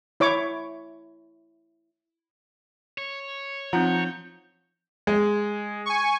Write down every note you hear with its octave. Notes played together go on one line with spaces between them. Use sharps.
E4 C#5 D6
C#5
F3 C4 D#4 F4 F#5 A#5 G6
G#3
G#5 C#6